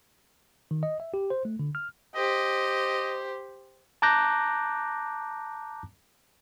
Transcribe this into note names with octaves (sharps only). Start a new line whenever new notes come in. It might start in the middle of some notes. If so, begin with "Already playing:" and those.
D#3
D#5
E5
G4
C5
A3
D3
F6
G4 C5 D#5
A5 A#5 D6 F#6 G6 A#6